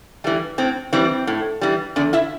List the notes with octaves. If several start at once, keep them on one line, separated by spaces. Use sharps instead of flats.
E3 G3 A3
A2 C4
E3 G3 C4
A2
E3 G3
E2 D3 D4
E4 E5